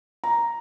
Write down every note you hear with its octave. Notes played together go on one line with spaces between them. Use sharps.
A#5